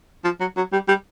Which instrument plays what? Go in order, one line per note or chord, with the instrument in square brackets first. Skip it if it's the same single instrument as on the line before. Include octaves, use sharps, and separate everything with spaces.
[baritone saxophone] F3
F#3
F#3
G3
G3